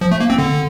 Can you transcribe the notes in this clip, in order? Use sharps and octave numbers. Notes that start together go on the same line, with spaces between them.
F3
A3
A#3
C4
D3